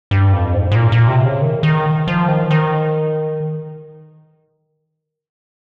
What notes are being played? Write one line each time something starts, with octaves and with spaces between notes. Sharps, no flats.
G2
F2
G#2
G#2
A#2
A#2
C3
C#3
D#3
D#3
F3
D#3
F3
D#3